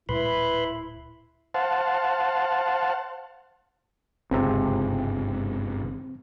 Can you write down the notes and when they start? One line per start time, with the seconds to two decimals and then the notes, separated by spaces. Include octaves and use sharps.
0.09 D1 A#2 G#3 E4 B4 B5 C6
1.54 C5 F5 F#5 A5
4.31 G1 C#2 G#2 C3 C4